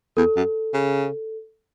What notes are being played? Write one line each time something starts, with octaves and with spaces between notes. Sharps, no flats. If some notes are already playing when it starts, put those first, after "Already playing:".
E2 A4
F#2
C#3